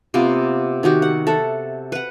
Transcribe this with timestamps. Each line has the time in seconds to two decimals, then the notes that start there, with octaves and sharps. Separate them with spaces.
0.14 C3 A#3 B3 F4
0.83 D#3 D#4 F#4 G4
1.02 F#5
1.27 A4 E5 F#5
1.92 B4 F#5